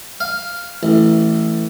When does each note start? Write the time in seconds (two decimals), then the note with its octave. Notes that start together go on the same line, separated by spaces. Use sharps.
0.20 F5
0.83 A1